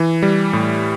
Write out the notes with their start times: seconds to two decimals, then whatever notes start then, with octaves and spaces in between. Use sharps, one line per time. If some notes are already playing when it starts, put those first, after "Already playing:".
Already playing: E3
0.22 G3
0.53 A2